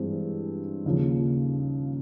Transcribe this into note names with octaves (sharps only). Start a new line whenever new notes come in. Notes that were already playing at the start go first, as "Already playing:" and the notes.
Already playing: G2 E3 G#3 C4
D#2 C#3 F3 A#3